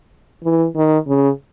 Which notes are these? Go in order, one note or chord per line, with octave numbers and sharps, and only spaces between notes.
E3
D#3
C#3